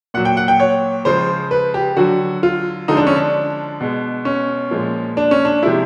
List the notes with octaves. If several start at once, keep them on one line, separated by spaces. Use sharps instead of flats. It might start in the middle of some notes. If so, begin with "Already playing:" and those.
A#2 F#3 F#5
G5
F#5
G5
C#5
C#3 F3 G#3 C5
B4
G4
D3 F#3 F#4
F4
D3 F3 G#3 D#4
D4
C#4
D4
B2 G#3
C#4
A#2 F3 G#3
D4
C#4
D4
C3 F3 G#3 E4